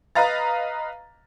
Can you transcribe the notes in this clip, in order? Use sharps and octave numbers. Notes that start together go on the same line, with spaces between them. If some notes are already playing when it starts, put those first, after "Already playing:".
B4 D#5 F5 A#5 A6